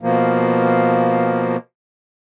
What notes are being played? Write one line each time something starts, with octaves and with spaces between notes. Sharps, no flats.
B2 F3 A#3